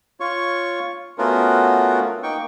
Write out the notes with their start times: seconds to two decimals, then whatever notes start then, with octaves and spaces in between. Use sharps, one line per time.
0.20 F4 C#5 C#6
1.18 A3 B3 C#4 F4 F#4 A#4
2.23 A#3 D#4 G5 C#6